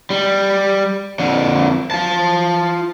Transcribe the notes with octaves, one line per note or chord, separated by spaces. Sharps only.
G3
F2 D3
F4 A5